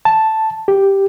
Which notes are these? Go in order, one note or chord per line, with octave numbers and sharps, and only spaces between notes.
A5
G4